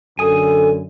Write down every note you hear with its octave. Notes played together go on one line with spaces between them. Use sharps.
F#2 D3 A4 G#5 D#6